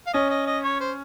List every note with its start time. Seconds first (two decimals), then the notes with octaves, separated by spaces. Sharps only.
0.07 F5
0.13 C#4 D#5
0.30 D#5
0.47 D#5
0.64 C#5
0.80 C5